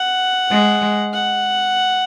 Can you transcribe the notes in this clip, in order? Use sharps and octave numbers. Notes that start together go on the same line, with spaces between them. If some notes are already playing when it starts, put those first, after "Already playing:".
Already playing: F#5
G#3
F#5